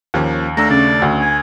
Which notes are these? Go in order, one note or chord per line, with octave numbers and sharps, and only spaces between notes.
D#2 F3 A#3 C#4
A3 D4 A#5 E6
C#3 D5
D2
G#5